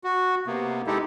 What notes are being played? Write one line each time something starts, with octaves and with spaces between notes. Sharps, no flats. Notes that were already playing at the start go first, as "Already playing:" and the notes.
F#4
C3 A#3 B3
G#3 D#4 E4 G4 A4